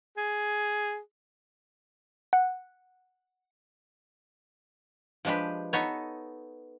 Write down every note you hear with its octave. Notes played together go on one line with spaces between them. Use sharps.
G#4
F#5
F3 G#3 D4 G4 B4
B3 D#4 A4 C#5